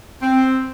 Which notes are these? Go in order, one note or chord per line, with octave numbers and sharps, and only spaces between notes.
C4